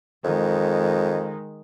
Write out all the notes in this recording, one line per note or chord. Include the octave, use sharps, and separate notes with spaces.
F2 D#3 G#3